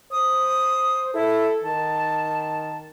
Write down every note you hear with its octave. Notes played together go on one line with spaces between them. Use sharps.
C5 D#6
E4 A4
D#3 A5